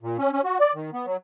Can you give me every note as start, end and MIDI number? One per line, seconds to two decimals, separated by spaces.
0.02 0.17 46
0.19 0.31 61
0.32 0.41 61
0.44 0.58 66
0.60 0.73 74
0.75 0.90 51
0.93 1.06 59
1.06 1.17 54